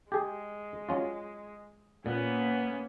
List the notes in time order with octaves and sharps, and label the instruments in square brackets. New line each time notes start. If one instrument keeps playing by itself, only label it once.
[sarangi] G#3 [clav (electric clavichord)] G4 G#4
[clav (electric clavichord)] F#3 C#4 F4
[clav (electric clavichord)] A#2 [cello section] A#3 [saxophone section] B3 [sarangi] C#4